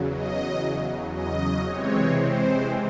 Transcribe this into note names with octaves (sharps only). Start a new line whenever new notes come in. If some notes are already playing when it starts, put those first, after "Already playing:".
Already playing: E2 C#3 F#3
D#5
D#5
C3 E3 G#3 C4 C#5
C5